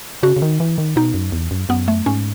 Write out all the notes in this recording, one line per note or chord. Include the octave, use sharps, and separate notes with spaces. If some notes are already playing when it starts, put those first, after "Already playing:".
C#3 F#4
C#3
D#3
E3
D#3
B2 D#4
F#2
E2
F#2
F#2 B3
A3
G#2 C#4